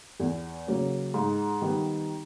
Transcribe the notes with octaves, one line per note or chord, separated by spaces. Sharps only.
E2
C#3 F#3 A#3 C#4
G#2
D#3 G3 B3